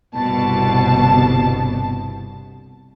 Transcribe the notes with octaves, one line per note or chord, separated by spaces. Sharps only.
G1 C2 B2 A5